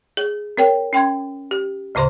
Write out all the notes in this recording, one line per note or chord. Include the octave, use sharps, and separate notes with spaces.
G#4
C4 A#4 C#5 G5
C#4 G5 C6 G#6
G4
D2 A2 C#3 C5 C6